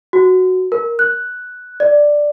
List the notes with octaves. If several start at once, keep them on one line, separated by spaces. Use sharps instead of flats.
F#4
A#4
F#6
D5